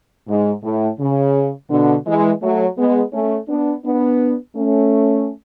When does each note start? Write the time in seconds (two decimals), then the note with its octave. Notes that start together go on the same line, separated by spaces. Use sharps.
0.28 G#2
0.63 A2
0.99 C#3
1.70 B2 D3
2.06 E3 G#3
2.42 F#3 A3
2.77 G#3 B3
3.13 A3 C#4
3.48 B3 D4
3.85 B3 D4
4.55 A3 C#4